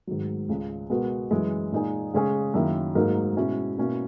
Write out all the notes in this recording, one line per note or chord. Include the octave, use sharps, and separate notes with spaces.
G#2 D#3 F#3
C#2 C#3 G#3
B2 G#3 B3 F#4 A#4
F#2 E3 G#3
A#2 G#3 D#4 G#4
C#3 G#3 C#4 G#4
F#2 D#3 A#3 E4
G#2 F#3 A#3 D#4 A#4
B2 G#3 C#4 E4
B2 A#3 C#4 E4